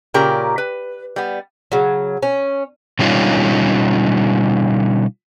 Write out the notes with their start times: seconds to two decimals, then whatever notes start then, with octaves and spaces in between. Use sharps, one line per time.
0.14 A#2 C#3 G4 A#4 D5 A#5
0.58 B4
1.16 G3 B3
1.72 C#3 F#3
2.23 C#4
2.99 B2 D3 G3 C#4 D#4 F4